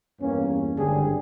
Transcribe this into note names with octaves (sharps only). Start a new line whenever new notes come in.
E2 G2 A#3 C#4
G#1 G2 D3 D4 G4 G#4